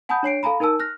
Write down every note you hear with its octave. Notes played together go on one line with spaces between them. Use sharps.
F#5 G#5 A5 B5 D#6 G6
D4 C#5 C7 D7
A4 F5 G#5 A#5 B5
D#4 A#4 G#5 A5 E6
F6 F#6 A#6